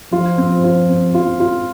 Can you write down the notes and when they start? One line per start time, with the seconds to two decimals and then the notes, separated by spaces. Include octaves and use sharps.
0.12 F3 F4
0.38 C4
0.64 F4
0.89 C4
1.14 F4
1.40 F4